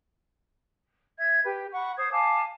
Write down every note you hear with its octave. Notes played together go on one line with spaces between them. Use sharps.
E5 G#6
G4 B4
F#5 B5 C#6
C5 D#6 G#6
F5 G#5 A5 D6